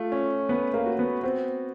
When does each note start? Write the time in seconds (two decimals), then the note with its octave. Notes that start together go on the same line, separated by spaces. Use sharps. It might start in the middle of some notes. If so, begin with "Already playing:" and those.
Already playing: A3 F4
0.12 C#4
0.49 B3 B4
0.74 A#3
0.86 F#4
0.99 B3
1.23 B3 C4